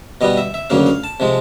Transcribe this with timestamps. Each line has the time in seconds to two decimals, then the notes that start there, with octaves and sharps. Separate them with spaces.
0.21 B2 G3 B3 D#5
0.37 E5
0.54 E5
0.70 D2 C#3 F#3 A#3 F5
0.86 F5
1.04 A5
1.20 C3 F3 G#3